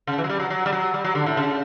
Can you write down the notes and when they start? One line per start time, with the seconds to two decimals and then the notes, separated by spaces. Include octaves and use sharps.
0.07 C#3
0.18 E3
0.24 F#3
0.30 G3
0.40 F#3
0.50 F#3
0.66 G3
0.73 F#3
0.94 G3
1.05 F#3
1.15 D3
1.26 A2
1.37 C#3